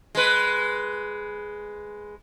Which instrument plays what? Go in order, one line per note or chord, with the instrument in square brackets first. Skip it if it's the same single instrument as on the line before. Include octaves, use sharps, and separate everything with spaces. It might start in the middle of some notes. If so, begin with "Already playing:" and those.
[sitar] G#3 B4